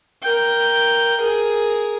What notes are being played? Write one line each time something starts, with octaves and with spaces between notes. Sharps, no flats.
A#4 G5
G#4 A#4